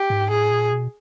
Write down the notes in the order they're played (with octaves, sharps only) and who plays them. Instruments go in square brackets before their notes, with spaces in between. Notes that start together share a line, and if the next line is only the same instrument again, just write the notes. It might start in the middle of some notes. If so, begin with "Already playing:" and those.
Already playing: [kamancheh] G4
[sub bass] G#2
[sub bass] A2 [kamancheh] G#4
[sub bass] A#2
B2